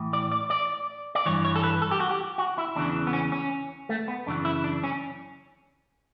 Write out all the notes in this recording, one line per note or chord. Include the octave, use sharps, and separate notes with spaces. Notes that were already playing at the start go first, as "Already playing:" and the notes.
Already playing: A2 E3
D5
D5
D5
D5
G2 E3 C#5
C#5
A4
B4
A4
G4
F#4
G4
F#4
E4
E2 C#3 E3 D4
B3
C#4
C#4
A3
B3
F#2 C#3 E3 D4
E4
D4
C#4